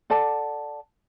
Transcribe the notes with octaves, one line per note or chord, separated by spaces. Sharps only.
A4 D5 F#5 A5